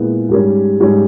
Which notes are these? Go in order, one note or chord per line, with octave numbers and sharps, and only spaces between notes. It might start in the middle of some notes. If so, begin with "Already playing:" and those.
Already playing: A#2 G#3 B3 E4
G#2 G3 C#4
G#2 G3 C#4